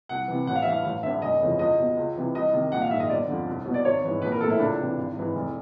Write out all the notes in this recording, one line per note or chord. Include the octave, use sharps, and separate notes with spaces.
C2 F#5
C3 E3
A1 F#5
F5
E5
G2 E3 F5
A1 F5
G2 D3 E5
F1 D#5
F2 C#3 E3
C#2 D#5
B2
C#2
C3 E3
C2 D#5
C3 D#3
A#1 F#5
F5
G#2 D#3 E5
D#5
G1 D5
F2 D3
C2
B2
D5
G#1 C#5
G#2 E3
A#1 B4
A#4
A2 E3 A4
E4
C#2 D4
C3 E3
G#1
G#2 E3
F1